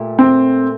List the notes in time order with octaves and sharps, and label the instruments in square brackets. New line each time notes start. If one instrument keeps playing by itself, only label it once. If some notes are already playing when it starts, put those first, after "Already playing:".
Already playing: [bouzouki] A#2 A3 G4
[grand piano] C4